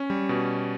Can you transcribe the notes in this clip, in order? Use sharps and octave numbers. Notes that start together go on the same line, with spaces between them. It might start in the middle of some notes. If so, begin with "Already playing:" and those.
Already playing: C#4
G3
B2